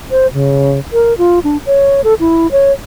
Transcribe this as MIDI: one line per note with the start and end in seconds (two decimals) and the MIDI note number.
0.11 0.27 72
0.33 0.79 49
0.93 1.16 70
1.18 1.39 65
1.44 1.57 62
1.66 2.01 73
2.04 2.14 69
2.20 2.50 64
2.52 2.72 73